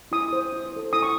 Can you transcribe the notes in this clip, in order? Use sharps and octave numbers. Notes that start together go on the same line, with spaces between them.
E4 D#6
C5
E4
A4 C5
E4 D#6
C#6